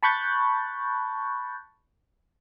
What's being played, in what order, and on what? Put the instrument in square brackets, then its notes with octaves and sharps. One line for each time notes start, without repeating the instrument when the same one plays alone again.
[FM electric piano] A5 B5 C#6 F#6 G6 A6